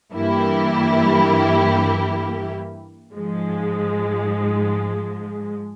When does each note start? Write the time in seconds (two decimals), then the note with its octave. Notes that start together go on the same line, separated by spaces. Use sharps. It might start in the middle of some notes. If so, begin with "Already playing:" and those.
0.12 G2 E3 A#3 E4 G4
3.14 G#2 F3 G#3